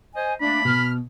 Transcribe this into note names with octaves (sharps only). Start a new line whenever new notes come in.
C5 D#5 G#5
A3 A#3 D4 B5
B2 F6